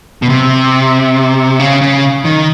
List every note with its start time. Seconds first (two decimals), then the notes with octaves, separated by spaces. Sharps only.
0.22 B2
0.29 C3
1.60 C#3
1.81 C#3
2.25 D#3